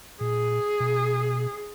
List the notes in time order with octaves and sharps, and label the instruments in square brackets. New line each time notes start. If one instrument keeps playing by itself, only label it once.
[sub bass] A#2 [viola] G#4
[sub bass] B2